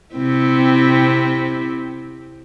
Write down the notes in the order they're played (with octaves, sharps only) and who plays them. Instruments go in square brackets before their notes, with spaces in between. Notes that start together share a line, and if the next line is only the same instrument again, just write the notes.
[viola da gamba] C3 C4 E4